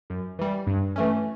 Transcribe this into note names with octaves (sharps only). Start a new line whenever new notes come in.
F#2
E3 G3
G2
E3 A3 C#4